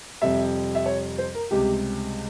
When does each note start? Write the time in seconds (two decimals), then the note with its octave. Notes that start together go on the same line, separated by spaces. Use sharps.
0.22 F2 C3 G3 E5
0.75 E5
0.86 C#5
1.18 C5
1.35 A#4
1.51 C#2 C3 G3 G4